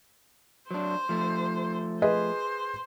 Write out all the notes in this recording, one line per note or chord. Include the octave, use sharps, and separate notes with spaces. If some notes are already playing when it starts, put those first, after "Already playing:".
F#3 D4 C5
F3 A3
G#4 B4 C5 D#5